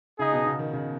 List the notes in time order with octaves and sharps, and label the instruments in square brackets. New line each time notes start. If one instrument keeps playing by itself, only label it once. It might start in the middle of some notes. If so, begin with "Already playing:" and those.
[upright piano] C#3 [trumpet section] D#4 G#4 D#5
[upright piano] B2
C#3
D#3
C#3